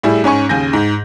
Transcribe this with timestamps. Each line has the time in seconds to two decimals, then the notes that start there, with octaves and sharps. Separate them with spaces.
0.03 A2 G3 E4 G#4
0.24 G#2 C#4 G#5 C#6
0.49 D#2 C#3 G#5 G6 A#6
0.73 G#2